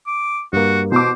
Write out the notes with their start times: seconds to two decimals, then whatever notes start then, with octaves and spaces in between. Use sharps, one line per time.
0.07 D6
0.53 G2 A#3 F#4
0.92 B2 C5 D6